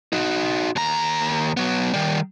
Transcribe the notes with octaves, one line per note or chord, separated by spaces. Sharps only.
D#4 F#4
D#2 A#5
F#3 B3
D#3 G3